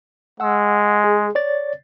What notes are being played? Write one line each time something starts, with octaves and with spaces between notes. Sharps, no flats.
G#3 F#5 E6
G#4
C#5 D5 A6